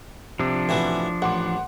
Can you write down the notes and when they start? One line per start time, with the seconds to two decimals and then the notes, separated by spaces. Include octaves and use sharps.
0.39 C3 F3 D4
0.69 A1 E3 F#4
1.22 A1 F#5 C6 D6